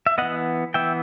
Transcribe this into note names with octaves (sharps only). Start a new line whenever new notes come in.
E5
E3 B3 D#5 F#5
E3 B3 E5 G5